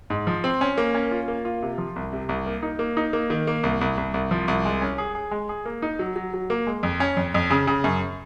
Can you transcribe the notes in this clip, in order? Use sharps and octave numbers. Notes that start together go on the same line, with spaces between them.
G#2
F3
C4
C#4
A#3
C#4
F4
A#3
F4
C3
F3
C2
C3
C2
A#3
D#4
A#3
D#4
A#3
D#3
A#3
C2
C2
C2
C2
F3
C2
G#3
C#4
G#4
G#4
G#3
G#4
A#3
D#4
F#3
F#3
F#3
A#3
G#3
F2
C#4
F2
F2
C#3
C#3
F#2